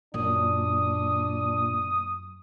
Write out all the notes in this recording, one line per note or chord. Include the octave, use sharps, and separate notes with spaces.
F#2 A#2 D4 D#6